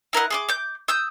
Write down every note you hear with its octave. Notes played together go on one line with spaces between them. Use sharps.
E4 A#4 D#5 F#5
G#4 C6 D6
D6 G6
D#6 E6 G6